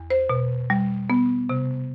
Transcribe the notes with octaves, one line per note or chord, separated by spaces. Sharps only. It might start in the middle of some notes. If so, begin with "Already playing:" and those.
Already playing: E2
C5
B2
G3
B3
C3